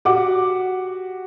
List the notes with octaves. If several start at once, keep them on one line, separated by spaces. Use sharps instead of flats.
F#4 G4 F#5 D6